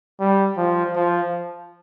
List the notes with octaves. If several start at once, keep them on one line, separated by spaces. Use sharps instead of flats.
G3
F3
F3